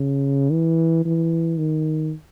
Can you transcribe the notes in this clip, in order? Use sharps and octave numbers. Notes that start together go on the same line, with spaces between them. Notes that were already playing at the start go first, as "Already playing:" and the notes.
Already playing: C#3
E3
E3
D#3